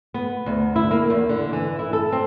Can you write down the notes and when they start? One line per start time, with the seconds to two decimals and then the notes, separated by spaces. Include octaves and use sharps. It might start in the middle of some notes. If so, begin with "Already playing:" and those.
0.14 B3
0.46 D2
0.76 E4
0.91 A#3
1.10 E2
1.29 D3
1.53 E3
1.79 E4
1.93 A4
2.12 C4